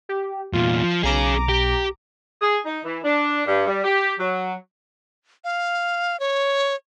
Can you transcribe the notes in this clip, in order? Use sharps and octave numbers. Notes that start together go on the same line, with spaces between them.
G4
E2 A#2 F4
F3
B1 C#4 G#4 A#5 D6
G4
G#4
D#4
E3
D4
G2
G3
G4
F#3
F5
C#5